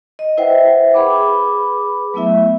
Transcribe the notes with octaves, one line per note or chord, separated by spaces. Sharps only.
D#5
E4 B4 C5 E5 F#5 G5
G#4 B4 B5 D6
F#3 A3 B3 E4 E5